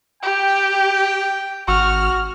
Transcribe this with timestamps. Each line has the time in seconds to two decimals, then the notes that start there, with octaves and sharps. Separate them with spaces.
0.23 G4 G5
1.68 G#1 F#4 F6